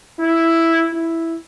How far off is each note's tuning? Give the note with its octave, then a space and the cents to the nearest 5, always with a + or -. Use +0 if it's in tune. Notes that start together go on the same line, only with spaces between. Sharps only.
E4 +0
E4 +0